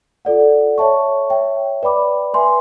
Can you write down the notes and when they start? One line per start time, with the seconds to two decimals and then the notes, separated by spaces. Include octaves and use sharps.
0.25 F4 A4 D5 F#5
0.78 C#5 E5 A5 C#6
1.30 C#5 E5 G5
1.83 B4 D5 G5 B5 D6
2.34 B4 E5 G#5 C6